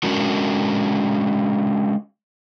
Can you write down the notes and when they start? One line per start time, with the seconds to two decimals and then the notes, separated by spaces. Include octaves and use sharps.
0.03 G#3 C#4 D4 F#4 A#4